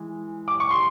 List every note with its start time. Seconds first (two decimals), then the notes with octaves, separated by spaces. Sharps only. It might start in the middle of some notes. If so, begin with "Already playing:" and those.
Already playing: E3 G#3
0.48 D6
0.60 C#6
0.71 C6